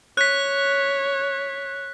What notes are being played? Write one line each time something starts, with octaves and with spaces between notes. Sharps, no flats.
C#5 F#6 B6